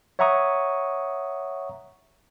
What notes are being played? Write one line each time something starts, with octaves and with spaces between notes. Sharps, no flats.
C#5 E5 F#5 A#5 C#6 D#6